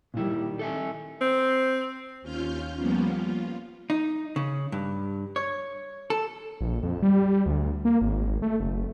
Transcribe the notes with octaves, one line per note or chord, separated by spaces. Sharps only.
A#2 D#3 G3 E4
A4 E5 G#5
C4
D#2 C#4 F4 F6 G6
F3 G3 A#3 B3 C#4 F4
F4
D#4
C#3
G2
C#5
A4
A#1
F2
G3
D2
A#3
G#1
A3
F#1